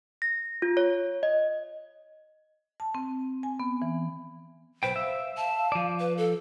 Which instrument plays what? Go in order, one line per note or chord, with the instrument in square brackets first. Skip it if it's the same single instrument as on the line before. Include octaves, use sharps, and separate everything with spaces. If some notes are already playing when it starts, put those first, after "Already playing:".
[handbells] A#6
F4
C#5
D#5
[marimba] A5
C4
G#5
B3
E3
[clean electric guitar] B1 B4 G5 [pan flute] C5
[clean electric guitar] E5 [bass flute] F5
[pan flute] A5
[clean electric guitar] F3 D5
[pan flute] B4
A4